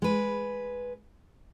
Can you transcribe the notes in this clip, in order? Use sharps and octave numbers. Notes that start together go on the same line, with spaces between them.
G#3 B4